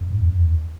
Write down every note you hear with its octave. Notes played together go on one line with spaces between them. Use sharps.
F#2
G#2
E2
F#2
E2